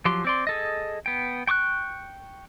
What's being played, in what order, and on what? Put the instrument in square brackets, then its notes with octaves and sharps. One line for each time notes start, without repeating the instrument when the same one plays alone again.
[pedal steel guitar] F3 F#3 G4 C6
C4 D5 C6
G#4 A4 D#5
B3 G5
G5 C#6 D6 F#6